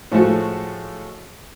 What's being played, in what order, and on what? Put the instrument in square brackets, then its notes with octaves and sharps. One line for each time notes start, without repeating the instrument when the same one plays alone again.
[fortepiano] A2 F3 G#3 A3 F#4